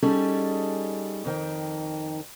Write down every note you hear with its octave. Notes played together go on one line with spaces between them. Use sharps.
G3 C#4 D#4 G#4 A4
F2 D#3 G5